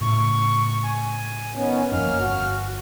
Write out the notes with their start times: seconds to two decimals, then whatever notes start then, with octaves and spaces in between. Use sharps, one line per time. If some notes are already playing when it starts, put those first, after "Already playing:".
0.01 A2 C#3 C#6
0.83 G#5
1.55 D#3 B3 C#4
1.92 G1 F2 A#3 C#4 F6
2.18 G1 F#4